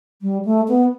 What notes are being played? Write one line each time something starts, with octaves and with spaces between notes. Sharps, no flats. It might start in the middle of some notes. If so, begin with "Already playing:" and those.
G3
A3
B3